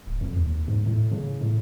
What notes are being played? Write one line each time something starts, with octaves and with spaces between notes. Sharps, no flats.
D1
F2
D#2
G#2
A2
C#3
A2